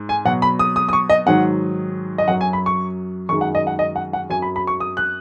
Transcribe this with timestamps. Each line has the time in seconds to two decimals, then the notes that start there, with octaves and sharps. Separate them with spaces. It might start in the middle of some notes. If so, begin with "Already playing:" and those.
Already playing: G#2
0.09 G#5
0.25 B2 F#3 F#5
0.42 B5
0.59 D#6
0.76 D#6
0.89 D#6
0.93 C#6
1.10 D#5
1.26 G#2 D#3 F#3 F#5
2.18 D#5
2.28 F#2 F#3 F#5
2.41 G#5
2.53 B5
2.66 C#6
3.29 F#2 D#3 G#3 C#6
3.41 F#5
3.55 D#5
3.67 F#5
3.79 D#5
3.96 F#5
4.13 F#5
4.30 F#2 F#3 G#5
4.42 B5
4.56 B5
4.67 C#6
4.80 D#6
4.97 F#6